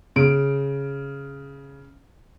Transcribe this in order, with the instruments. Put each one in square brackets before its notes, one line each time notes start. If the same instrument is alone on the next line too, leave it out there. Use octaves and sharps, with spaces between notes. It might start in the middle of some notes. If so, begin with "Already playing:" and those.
[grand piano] C#3 D7